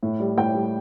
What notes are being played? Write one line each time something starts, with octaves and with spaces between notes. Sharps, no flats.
A2
G3
A2 G5
G3